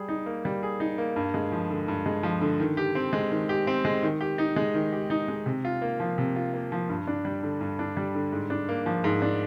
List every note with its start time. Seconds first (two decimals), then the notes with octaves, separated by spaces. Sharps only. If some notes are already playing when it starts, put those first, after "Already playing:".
Already playing: G3 G#4
0.08 D#4
0.26 A#3
0.45 G3
0.63 G#4
0.80 D#4
0.98 A#3
1.16 G2
1.34 G#3
1.52 F3
1.70 D3
1.88 G2
2.06 G#3
2.23 F3
2.41 D3
2.60 D#3
2.77 G4
2.95 C4
3.13 G#3
3.31 D#3
3.49 G4
3.67 C4
3.85 G#3
4.03 D#3
4.21 G4
4.38 D#4
4.56 G#3
4.74 D#3
4.93 G4
5.10 D#4
5.28 G#3
5.46 C3
5.65 F4
5.82 A#3
6.00 F3
6.18 C3
6.36 F4
6.54 A#3
6.72 F3
6.89 G2
7.07 D4
7.25 G3
7.43 D3
7.61 G2
7.79 D4
7.97 G3
8.15 D3
8.32 G#2
8.50 D4
8.69 A#3
8.86 F3
9.04 G#2
9.22 D4